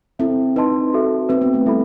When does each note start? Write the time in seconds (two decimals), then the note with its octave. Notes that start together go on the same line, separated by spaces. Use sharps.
0.19 C4 E4 A4 E5
0.56 D#4 B4 D#5 A5 C6
0.93 F#4 A4 E5
1.29 C4 B4 E5 A5
1.41 B3
1.54 A3
1.66 G3 E4 A4 E5 B5